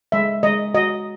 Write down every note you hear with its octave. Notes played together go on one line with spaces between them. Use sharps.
G#3 E5
G#3 D#5
F#4 D#5